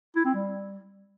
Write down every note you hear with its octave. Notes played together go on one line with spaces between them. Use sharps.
E4
C4
G3